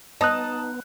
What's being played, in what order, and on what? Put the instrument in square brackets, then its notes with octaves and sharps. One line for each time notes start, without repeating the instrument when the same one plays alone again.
[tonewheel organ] B3 [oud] D#4 [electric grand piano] A5 D#6 F#6